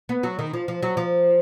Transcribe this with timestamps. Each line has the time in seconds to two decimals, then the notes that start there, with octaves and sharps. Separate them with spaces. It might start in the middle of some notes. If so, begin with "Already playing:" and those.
0.09 B3
0.23 F#3
0.39 D#3
0.53 F3
0.68 F3
0.83 F#3
0.97 F3